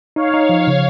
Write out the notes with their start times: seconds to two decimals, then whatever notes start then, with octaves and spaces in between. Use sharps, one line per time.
0.16 D#4 C#5 F5
0.34 D#4
0.49 F3
0.67 C#3